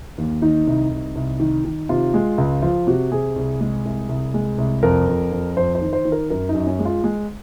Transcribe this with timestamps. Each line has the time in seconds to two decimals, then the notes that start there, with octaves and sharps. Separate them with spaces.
0.18 D#2
0.42 D#3 D#4
0.67 C2
0.91 C2
1.15 C2
1.40 D#3
1.65 D#3
1.89 C3 F4
2.14 G#3
2.38 C#2
2.62 F3 F4
2.87 C3 F#4
3.12 C3 G#4
3.36 C2
3.61 G#3
3.85 C2
4.09 C2
4.34 G#3
4.58 C2
4.83 F2 A#4
5.08 F2
5.32 F2
5.57 F2 C5
5.75 C5
5.81 D#3
5.93 C5
6.05 D#3
6.12 A#4
6.30 F#2 A#4
6.49 D#4
6.55 F#2
6.67 C#4
6.79 G#3
6.85 F4
7.04 G#3